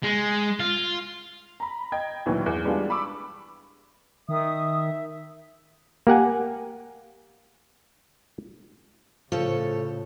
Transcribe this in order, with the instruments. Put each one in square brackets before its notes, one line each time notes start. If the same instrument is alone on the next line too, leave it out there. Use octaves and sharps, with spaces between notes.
[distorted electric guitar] G#3
F4
[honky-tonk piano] A#5 B5
D#5 G5 G#6
D2 A#2 D#3 E3 F#3
E2
E3 G3 G#3 B3 D4 F4
B5 C#6 D6 E6
[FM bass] D#3 [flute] E5 [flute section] D#6
[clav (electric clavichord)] A#3 G4 F#5 G#5
[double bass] A2 C#3 [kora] F3 [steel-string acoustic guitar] A4 C#5